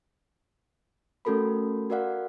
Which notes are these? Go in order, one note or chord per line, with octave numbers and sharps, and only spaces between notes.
A3 C#4 F#4 A4 A#4 B5
F#4 A#4 D5 F5 F#5